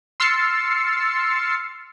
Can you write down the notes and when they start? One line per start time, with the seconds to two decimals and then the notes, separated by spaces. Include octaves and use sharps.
0.20 C6 E6 F6 A6 C7 C#7